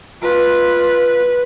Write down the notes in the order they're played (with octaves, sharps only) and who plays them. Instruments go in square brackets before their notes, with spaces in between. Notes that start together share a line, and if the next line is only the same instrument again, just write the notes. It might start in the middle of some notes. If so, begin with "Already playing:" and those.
[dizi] F4 [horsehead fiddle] B4